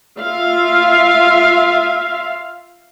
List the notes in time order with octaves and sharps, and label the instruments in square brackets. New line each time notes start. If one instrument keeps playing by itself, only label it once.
[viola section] F4 E5 F5